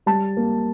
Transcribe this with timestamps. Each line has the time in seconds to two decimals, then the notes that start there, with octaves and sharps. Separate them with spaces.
0.06 G3 A5
0.37 A#3